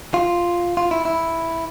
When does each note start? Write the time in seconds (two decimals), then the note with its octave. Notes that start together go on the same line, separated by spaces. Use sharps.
0.14 F4
0.77 F4
0.91 E4
1.05 E4